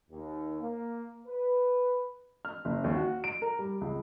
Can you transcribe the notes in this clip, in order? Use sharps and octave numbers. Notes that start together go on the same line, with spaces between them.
D#2
A#3
B4
F6
F#1
D#2
F#4
D7
A#4
G3
C#2